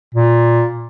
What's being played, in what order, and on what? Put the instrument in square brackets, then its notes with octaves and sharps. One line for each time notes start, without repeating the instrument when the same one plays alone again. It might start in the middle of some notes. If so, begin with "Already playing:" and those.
[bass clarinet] A#2